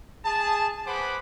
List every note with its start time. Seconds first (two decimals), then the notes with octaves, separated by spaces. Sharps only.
0.25 G#4 A5
0.87 G#4 B4 C5 F#5 B5 D6